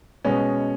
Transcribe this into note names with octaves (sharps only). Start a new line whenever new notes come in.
B2 G#3 B3 C#4